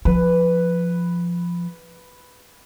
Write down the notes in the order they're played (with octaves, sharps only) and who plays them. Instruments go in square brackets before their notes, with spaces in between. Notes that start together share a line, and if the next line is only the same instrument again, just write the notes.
[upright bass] F3 [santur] B4